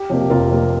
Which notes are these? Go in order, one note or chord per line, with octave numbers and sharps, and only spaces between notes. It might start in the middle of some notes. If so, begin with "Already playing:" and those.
Already playing: G4
F2 C3 A#3
G4
F1 F4 A#4
F2 C3 A#3